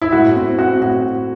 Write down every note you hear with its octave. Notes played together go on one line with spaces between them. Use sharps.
E4
A2 F#4
C4
C4 F#4
A2 F#4